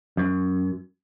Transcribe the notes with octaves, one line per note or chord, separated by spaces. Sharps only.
F#2